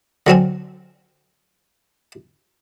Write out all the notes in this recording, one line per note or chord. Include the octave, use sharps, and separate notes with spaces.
D3 F#3 C4 C#4